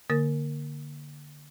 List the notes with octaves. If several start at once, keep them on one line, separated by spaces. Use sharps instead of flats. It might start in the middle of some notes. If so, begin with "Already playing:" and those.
D3 A#3 A#4 A6